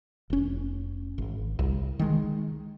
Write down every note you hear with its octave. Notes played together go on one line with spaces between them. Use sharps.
F1 C#4
G#1
C2
D#3 G#3